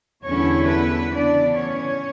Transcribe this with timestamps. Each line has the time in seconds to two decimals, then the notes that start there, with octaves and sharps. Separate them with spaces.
0.24 E2 D3 G3 B3 C#4 E4 C#5
0.69 B3 B4
1.13 C#3 E3 B3 D4 D5
1.59 C#4 C#5